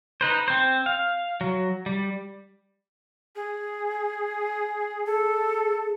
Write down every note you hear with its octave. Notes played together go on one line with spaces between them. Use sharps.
D#4 B4 C5
C4 C5
F5
F#3
G3
G#4
G#4 A4